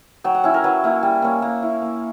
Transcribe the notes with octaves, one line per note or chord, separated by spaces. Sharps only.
F#3 G5
F#5
C#4 E4
A#4
F#3 B4
A#3 E4
G3
A#3 C#4
A#3
E4
A#3